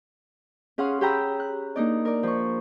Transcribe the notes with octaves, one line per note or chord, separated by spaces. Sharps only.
C#4 G#4 F5 F#5 C6
G4 G#4 G5 A#5 B5 E6
F#6
A#3 D4 D#4 D5
A#4 D5
F3 C#6